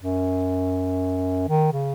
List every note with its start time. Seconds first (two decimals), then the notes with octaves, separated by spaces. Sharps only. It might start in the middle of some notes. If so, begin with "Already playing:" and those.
0.01 F#2
1.49 D#3
1.73 C#3